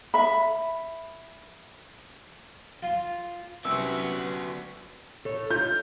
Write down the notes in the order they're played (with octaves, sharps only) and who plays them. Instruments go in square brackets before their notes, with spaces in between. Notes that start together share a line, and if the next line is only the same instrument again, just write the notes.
[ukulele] E5 B5
[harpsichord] F4
[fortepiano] C2 [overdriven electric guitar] D3 F#4 [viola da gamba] F#3 B3 C#4 [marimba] E6
[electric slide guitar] A4 C#5
[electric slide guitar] F4 [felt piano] G6